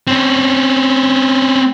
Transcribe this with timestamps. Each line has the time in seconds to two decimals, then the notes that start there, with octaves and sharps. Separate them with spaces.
0.07 C4 C#4